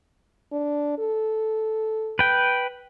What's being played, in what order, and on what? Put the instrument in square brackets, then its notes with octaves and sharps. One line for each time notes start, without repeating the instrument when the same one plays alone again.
[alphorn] D4
A4
[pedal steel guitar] B4 G5